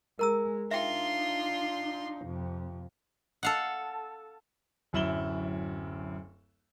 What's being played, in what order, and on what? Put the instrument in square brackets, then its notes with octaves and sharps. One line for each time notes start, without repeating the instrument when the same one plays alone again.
[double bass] G#3 [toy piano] A#4 A#5 E6
[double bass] D4 D#4 [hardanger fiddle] F4 C6 [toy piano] E5 G5
[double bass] F2 C3
[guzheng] A4 F5 F#5
[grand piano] D1 F#2 E4 E7 F#7 G7